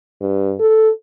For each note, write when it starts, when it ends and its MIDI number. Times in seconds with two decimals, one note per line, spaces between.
0.21 0.55 43
0.60 0.90 69